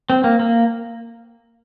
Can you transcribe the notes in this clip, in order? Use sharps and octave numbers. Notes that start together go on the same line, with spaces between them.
C4
A#3
A#3